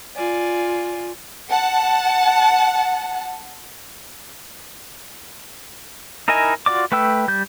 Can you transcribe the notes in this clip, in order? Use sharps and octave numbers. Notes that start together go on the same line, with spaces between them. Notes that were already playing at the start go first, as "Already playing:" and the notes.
F4 D5 G#5
F#5 A5
D#4 E4 A#4 D#5 G#5
F4 F#4 D5 D6
A3 B4 G5 E6
G3 G6